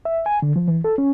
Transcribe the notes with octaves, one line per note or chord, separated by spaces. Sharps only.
E5
G#5
D3
F3
E3
A4
C#4